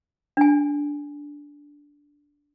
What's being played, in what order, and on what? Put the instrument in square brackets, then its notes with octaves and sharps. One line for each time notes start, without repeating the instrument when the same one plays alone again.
[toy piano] D4 G#5